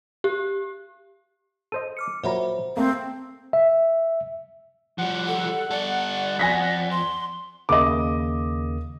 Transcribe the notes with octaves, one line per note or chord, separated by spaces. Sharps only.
G4
A4 C5 D#5 D#7
D6 F6 C#7
A#2 F#3 C5 E5 A#5 B5
A3 A#3 C4
E5
F3 G3 F#5
A4
G3 A4 D5
F2 G#5 A#6 B6
C6
D#2 C#3 A#3 D#5 D6